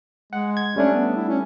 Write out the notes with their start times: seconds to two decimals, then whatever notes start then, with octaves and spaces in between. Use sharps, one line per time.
0.33 G#3 F#5
0.57 G#6
0.76 G3 A3 C#4 D4
0.94 B3
1.16 E4
1.29 C#4